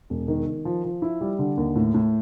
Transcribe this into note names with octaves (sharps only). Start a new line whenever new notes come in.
E1
D#3
D#3
F3
F3
E4
G3
D3
D#2
A2
A2